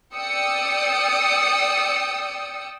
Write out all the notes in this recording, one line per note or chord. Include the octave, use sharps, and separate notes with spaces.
D5 G5 D#6 E6 C#7